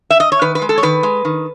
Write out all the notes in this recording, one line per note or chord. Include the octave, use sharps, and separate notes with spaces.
E5
D#5
C#5
D#3 B4
B4
G#3
A4
C#5
D#3 B4
G#3
D#3